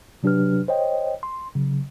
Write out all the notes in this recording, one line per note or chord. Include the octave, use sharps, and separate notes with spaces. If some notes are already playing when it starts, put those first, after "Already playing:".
C3 F#3 D4 G4 B4 F6
C5 C#5 D#5 G5
C6
C#3 F#3